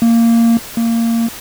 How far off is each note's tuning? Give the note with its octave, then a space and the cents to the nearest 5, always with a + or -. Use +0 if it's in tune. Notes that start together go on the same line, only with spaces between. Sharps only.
A#3 -15
A#3 -20